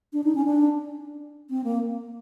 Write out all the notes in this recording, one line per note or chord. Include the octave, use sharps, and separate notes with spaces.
D4
D#4
C#4
D4
C4
A#3